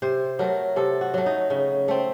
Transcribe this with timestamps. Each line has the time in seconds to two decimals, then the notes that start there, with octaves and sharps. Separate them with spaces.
0.02 C3 C5
0.39 F#3 A3 A#4
0.76 C3 A4
1.01 F#4
1.14 F#3 A3
1.26 D#4
1.50 C#3
1.88 A3 C4